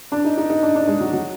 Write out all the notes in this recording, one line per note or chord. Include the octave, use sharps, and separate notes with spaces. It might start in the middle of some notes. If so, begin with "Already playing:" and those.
D4
D#4
D#4
D#4
D4
D4
G#3
F#3
F#3